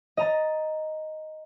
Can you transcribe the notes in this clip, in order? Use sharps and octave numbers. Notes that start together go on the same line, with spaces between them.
D#5 A#5 A6